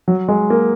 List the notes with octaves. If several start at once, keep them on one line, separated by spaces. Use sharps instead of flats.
F#3
G#3
A#3